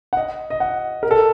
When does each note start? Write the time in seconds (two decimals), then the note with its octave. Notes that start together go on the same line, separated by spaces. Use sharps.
0.13 F#5
0.17 D#5
0.50 D#5
0.60 F#5
1.03 A#4
1.11 A4